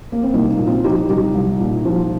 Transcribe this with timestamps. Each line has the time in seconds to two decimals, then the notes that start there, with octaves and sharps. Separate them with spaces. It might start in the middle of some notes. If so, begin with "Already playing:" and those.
0.12 A#3
0.23 C4
0.34 C2 A#3 D#4
0.50 A#3 D#4
0.59 A#2
0.67 C4 F4
0.84 F3 D#4 G4
1.09 C2 D#4 G4
1.35 C2
1.60 A#2
1.85 F3